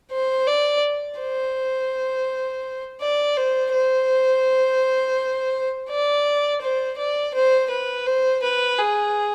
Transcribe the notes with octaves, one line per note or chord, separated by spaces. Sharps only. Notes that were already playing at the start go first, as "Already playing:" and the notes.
C5
D5
C5
D5
C5
C5
D5
C5
D5
C5
B4
C5
B4
G#4